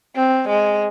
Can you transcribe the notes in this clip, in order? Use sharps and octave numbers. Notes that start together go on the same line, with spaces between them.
C4
G#3